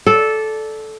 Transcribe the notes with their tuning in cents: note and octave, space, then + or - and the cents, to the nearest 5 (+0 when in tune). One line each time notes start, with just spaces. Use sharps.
A4 -10 D5 +0